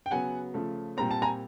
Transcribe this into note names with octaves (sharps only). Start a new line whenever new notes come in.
G5
C#3 F#3 B3 F#5 G#5
C#3 F3 A3
A#2 G3 C4 A#5
A5
G#5 A#5